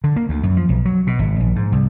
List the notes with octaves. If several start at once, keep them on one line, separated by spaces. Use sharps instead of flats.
D3
A#3
D2
F#2
F3
B1
F#3
B2
G#1
A#1
G#2
C2